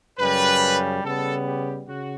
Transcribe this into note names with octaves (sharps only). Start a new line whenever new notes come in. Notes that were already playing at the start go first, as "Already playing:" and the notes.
F#2 C#3 G3 B4
C#3 G3 B3 A4
G4
C#3 F#4